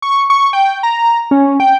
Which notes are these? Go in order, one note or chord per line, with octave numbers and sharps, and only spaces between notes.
C#6
C#6
G5
A#5
C#4
G5